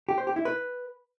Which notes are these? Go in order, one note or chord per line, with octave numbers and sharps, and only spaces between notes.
G4
C5
G4
E4
B4